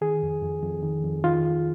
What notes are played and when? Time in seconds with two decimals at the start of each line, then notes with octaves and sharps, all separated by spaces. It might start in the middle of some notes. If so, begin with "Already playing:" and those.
0.01 D#3 G#4
0.23 F2
0.42 F2
0.63 F2
0.82 D#3
1.04 F2
1.24 D#3 F4